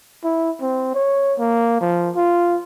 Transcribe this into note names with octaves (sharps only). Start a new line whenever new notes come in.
E4
C4
C#5
A#3
F3
F4